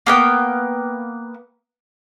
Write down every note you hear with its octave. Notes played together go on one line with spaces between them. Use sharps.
A#3 B3 G5